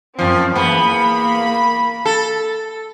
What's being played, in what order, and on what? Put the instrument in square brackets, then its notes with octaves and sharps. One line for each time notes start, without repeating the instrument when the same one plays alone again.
[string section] F#2 C4 [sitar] A#2 F3
[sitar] E2 B3 [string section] A#3 B5
[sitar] A4